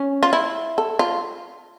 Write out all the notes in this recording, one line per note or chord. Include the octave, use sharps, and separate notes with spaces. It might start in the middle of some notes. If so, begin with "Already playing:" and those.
Already playing: C#4
F4
E4
A4
F4